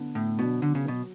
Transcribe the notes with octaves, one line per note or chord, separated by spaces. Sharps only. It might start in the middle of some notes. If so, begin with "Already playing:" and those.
Already playing: D3 B3
A2
B2 F#3 B3 D4
D3
C#3
B2 F#3